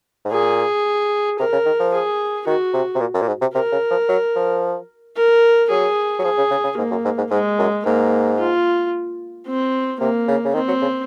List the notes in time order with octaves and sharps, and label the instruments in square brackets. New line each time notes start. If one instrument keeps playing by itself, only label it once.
[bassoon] G#2
[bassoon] A#2 [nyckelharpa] G#4
[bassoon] C3 [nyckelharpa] A#4
[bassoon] C#3
D#3
F3
[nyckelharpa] G#4
[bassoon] D#3 [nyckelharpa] F#4
[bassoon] C3
C3
A#2
F#2
A#2
G#2
C3
[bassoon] C3 [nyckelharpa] A#4
[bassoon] C#3
F3
F#3
F3
[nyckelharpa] A#4
[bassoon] F#3 [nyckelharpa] G#4
[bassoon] F#3
[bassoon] F3 [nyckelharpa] G#4
[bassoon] C#3
C#3
C#3
[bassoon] G#2 [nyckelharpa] A#3
[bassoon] F#2
G#2
G#2
[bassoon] G#2 [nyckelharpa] G#3
[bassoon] F#2
[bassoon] G#2 [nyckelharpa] A#3
[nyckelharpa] F4
C4
[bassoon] C3 [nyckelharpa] A#3
[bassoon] C#3
C#3
[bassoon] D#3 [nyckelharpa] C4
[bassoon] F#3
C#3